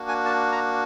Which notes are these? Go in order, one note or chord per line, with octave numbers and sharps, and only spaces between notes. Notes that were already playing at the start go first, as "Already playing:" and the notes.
Already playing: A#3 D4 F#4
G#5
A5
A#5